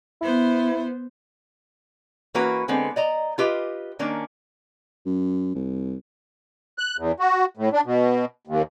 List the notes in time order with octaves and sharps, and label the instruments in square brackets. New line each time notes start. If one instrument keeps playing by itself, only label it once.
[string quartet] B3 C5 [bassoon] E4
[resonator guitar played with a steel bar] E3 A#3 C#4 F#4 A#4 B4
D3 G#3 B3 C4
D5 D#5 A#5
F4 G4 B4 D#5
D#3 A#3 C#4 D4
[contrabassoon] F#2
C2
[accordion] F#6
E2
F#4
A2
D4
B2
D#2